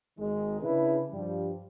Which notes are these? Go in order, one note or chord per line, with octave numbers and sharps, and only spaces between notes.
G#1 D#3 G#3
C#3 C#4 D4 E4 G#4 B4
G2 F3 G3